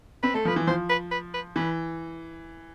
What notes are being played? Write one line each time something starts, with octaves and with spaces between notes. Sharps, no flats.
C4 B4
A3 A4
F3 B4
E3
F3 C5
B4
B4
B4
E3 B4